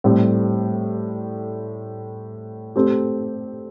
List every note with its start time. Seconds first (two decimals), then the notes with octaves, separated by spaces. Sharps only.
0.04 A2 G3 C4
2.76 A3 C4 G4